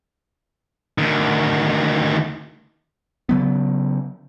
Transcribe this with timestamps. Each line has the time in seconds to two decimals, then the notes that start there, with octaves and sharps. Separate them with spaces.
0.98 D2 D#3
3.29 C#3 F#3 B3